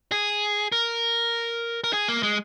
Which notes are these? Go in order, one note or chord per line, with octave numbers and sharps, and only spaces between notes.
G#4
A#4
A#4
G#4
A#3
G#3